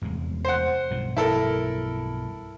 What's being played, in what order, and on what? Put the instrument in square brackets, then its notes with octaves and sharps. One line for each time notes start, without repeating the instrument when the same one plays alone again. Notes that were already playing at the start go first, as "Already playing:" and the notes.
[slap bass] F1 E2 G#3
[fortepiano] C5 F#5
[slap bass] B1 G2 F3
[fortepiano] E4 A4 A#4